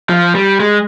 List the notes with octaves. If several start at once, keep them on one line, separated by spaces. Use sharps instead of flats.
F3
G3
G#3